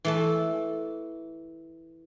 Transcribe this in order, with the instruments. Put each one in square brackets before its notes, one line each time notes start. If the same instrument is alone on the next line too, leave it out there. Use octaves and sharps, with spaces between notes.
[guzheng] E3 A3 A5